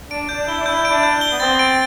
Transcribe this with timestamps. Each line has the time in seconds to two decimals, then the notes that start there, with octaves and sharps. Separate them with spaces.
0.11 D4 D7
0.29 D4 G6
0.47 E4 G7
0.61 D4
0.66 E4 G6
0.85 D7
0.91 D4
1.03 G6
1.21 G7
1.32 B3
1.40 C4 A6
1.59 D7